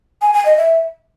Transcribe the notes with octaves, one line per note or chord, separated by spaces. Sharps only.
G#5
G#5
D#5
E5